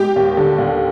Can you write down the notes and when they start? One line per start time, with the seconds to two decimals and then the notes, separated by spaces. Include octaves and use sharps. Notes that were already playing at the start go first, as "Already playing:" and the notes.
Already playing: G#3 G4
0.16 D#2
0.37 D3
0.58 D#2